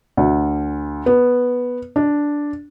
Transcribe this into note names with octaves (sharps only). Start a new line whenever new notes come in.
D2
B3
D4